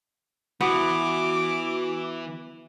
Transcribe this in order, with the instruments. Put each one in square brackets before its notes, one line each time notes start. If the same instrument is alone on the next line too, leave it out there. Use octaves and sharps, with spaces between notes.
[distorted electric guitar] E3 [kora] B3 [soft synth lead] F#4 [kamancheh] D6